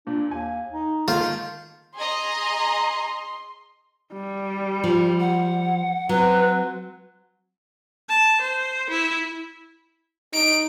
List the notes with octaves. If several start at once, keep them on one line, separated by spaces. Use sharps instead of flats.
A#2 D4
D#2 G#5
D#4
D3 D#3 A3 A#3 F4
G#4 D#5 A#5 C6
G3
F3
F#5
F#3 C4 B4
A5
C5
E4
D#4 D7